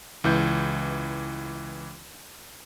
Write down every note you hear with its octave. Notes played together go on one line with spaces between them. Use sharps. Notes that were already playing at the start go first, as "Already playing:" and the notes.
C#2 E3 G6